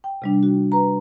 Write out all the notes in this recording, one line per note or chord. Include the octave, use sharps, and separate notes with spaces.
G5
C3 G3 D4
F#4
B4 A#5